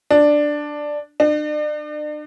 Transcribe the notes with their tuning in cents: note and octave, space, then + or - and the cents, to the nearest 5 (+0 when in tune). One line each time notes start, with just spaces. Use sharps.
D4 +5
D4 +40